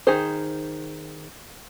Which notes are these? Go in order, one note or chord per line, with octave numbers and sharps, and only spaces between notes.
D#3 G#4 C5